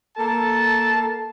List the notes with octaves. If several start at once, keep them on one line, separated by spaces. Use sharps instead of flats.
A#3 A4 A5